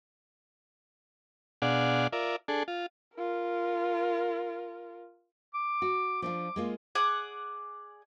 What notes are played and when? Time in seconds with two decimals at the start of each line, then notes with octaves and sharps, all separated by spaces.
1.62 B2 D4 G#4 D5 F5 F#5
2.13 F4 A#4 D5 E5
2.48 D4 G#4 A4
2.68 F4
3.15 F4 A#4
5.54 D6
5.82 F#4
6.22 F3 D4 F4 D6
6.56 G#3 A#3 F4
6.95 G#4 D5 F#5